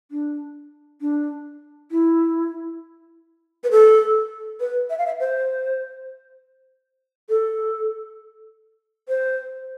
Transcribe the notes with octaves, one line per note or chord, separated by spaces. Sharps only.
D4
D4
E4
B4
A4
B4
E5
F5
E5
C5
A4
C5